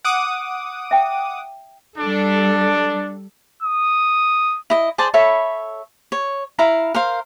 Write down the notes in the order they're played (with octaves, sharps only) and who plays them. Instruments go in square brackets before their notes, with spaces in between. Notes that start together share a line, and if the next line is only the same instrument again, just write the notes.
[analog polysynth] F#5 D6 D#6
[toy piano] E5 G5
[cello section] G3 A4 [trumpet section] D4
[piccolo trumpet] D#6
[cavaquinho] E4 D#5
G#4 C5 D5 A5
A4 C#5 E5 B5
C#5
E4 F5 A#5
A#4 C5 F5